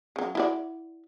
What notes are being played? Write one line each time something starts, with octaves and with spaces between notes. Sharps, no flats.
C#3 F#3
E4 F#4 D5